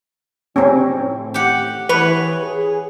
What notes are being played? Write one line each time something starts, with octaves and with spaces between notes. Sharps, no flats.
F#3 C4 C#4 D#4 G4
A2
G4 F#5
E3 B4 C#5
G#4